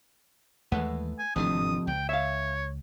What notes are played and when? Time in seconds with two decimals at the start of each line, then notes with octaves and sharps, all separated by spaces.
0.72 D#2 E3 G#3 A3 B4 F#5
1.19 G#5
1.36 G#1 F2 A2 C3 E3 D4 D#6
1.87 C#2 G5
2.09 C#5 E5 F5